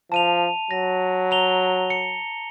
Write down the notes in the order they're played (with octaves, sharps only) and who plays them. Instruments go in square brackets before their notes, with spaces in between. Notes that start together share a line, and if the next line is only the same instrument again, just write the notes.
[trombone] F3 [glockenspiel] A5 D#7 F7
[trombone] F#3 [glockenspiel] A#6
[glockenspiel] A#5 F7 G7
C#7